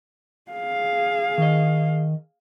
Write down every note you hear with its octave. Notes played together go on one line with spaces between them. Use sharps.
G#4 F5
D#3 D#5